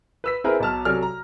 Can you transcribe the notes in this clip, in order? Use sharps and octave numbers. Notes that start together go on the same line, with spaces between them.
B4 E6 B6
C4 E4 G#4 A#4 B4
B1 F#3 A5 F6
C3 F#3 A4 D5 G#5 F6
A#5